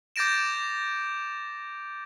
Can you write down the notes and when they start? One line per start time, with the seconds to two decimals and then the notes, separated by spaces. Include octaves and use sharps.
0.16 D6 G6 A6 A#6 D7 E7